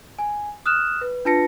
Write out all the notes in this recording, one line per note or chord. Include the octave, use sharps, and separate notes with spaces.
G#5
D#6 F6 F#6 E7
B4
D4 F4 B4 A5 A#6 C#7